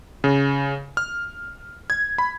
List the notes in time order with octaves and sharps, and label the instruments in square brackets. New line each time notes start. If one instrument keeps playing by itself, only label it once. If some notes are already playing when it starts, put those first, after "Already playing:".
[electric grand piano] C#3
F6
G#6
B5